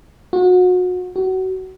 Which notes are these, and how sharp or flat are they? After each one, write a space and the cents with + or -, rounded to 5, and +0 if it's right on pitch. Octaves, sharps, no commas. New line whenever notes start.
F#4 -30
F#4 +25